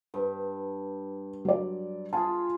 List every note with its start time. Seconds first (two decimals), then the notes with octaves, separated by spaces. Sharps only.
0.14 G2 B4
1.45 F#3 D5
2.13 F4 G#4 G#5 A5